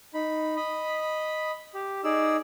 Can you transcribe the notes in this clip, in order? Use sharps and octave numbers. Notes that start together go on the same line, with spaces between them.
D#4 B5
D#5 B5
G4
D#4 G#4 D5 E6